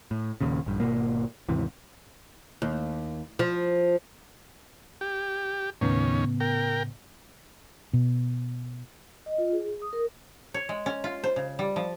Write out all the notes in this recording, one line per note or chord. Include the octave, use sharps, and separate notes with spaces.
A2
D#1 D#2 A#2 C#3
A#1 G2
G#1 B2 A#3
D#2 G#2 C3 E3
D#2
F3
G4
D#2 A2 C#3 B3 C#4
A#4 G5
B2
D#5
F4
G#4
D#6
A#4
C#5
G#3
C#4
F4
C5
C#3
G3
F3